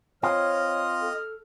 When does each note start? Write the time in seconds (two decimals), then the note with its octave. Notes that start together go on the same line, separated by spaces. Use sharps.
0.23 C4 F4 C#5 D#5 F6
1.02 A4